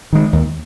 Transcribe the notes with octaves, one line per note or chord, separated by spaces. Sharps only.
D#3 G#3
D#2